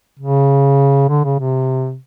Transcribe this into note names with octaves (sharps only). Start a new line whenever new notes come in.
C#3
D3
C#3
C3